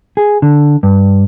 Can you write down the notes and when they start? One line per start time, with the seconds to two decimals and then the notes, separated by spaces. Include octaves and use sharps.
0.17 G#4
0.42 D3
0.83 G2